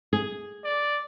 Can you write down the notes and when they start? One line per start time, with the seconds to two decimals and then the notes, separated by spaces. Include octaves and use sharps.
0.13 G#4
0.64 D5